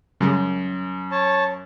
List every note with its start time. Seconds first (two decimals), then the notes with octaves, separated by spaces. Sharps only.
0.21 F#2 C#3 G3 G#3
1.12 C#5 A5